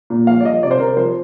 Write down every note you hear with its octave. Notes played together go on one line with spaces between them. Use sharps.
A#2
F3 F5
D5
F3 D#5
C3 D5
C5
C3 A#4
F3 C5